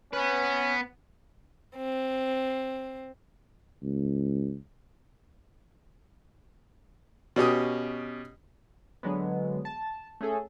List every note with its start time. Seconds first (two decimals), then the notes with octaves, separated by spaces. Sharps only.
0.13 B3 C#4 B4
1.76 C4
3.82 C#2
7.36 B2 C#4 G4 D#6
9.03 D3 F#3 G#3 B3
9.65 A5
10.21 A3 C#4 G#4 A4